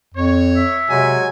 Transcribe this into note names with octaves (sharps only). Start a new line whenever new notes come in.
F2 C#5
E5
C3 F#3 G#3 G#5